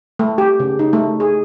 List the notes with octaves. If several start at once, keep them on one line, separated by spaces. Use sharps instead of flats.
A3
G4
C#3
D#4
A3
G#4